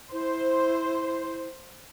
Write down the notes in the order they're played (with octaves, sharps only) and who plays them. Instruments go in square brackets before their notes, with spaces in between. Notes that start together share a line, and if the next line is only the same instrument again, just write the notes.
[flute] E4 [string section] C5